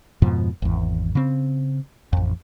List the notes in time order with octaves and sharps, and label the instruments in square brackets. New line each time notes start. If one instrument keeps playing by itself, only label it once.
[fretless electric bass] F2 G#2 B2 F3
G#1 E2
C#3 C4
A1 F2